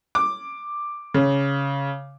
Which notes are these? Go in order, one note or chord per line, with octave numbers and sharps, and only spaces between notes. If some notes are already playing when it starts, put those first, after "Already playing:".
D6
C#3